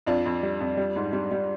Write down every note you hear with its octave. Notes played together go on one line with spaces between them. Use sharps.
F2 D4 F4
F2
G3
F2
G3
G#2
G3
G3